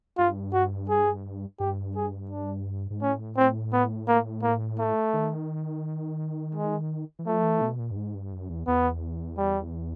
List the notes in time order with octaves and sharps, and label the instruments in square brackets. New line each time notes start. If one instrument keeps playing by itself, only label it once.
[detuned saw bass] G2 [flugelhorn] F4
[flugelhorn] F#4
G#4
[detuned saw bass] G2 [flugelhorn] G4
[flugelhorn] G#4
D4
[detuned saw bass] G#2
[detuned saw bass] A2 [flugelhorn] C#4
[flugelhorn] C4
B3
A#3
A#3
A3
[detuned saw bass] D#3
[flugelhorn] G#3
[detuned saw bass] E3
[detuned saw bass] F3 [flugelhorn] A3
[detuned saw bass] E3
B2
A#2
G2
G#2
G2
F#2
E2
[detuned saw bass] E2 [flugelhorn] B3
[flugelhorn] G3